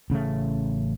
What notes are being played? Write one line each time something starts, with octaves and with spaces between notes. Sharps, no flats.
A1 C#3 E3 A3